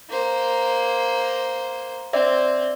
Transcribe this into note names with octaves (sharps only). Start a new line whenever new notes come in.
A#3 C5
C4 D5 E5